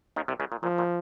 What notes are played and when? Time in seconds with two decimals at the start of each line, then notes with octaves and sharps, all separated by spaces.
0.16 D#2 D#3
0.28 C2 C3
0.40 C#2 C#3
0.52 A#2
0.63 A#2 F3
0.78 A#2